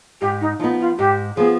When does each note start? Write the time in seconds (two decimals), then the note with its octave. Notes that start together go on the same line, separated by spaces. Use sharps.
0.21 G#2 G4
0.41 D#4
0.59 F3 D#4
0.64 B3
0.80 F4
0.98 G#2 G4
1.36 F3 B3 G#4